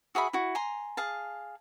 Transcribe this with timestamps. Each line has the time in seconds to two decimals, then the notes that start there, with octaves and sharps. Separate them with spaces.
0.15 F#4 G#4 E5 B5
0.33 E4 F#4
0.55 G#5 A#5 C6
0.97 G#4 F5 A5